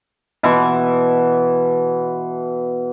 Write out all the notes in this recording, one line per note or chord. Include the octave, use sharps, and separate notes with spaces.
B2 E3 E5 C6